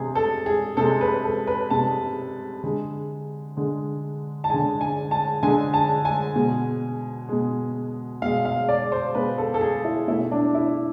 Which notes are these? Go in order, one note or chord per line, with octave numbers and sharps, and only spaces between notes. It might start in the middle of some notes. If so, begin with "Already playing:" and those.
Already playing: C3 G#3 G#4
A4
G#4
C3 G#3 A4
B4
A4
B4
C3 G#3 A5
D3 G#3
D3 G#3
A5
D3 G#3 G#5
G#5
A5
D3 G#3 G#5
A5
G#5
B2 G#3
B2 G#3
B2 G#3 F5
F5
D5
C5
B2 G#3 B4
A4
A4
G#4
E4
B2 A3 E4
D4
E4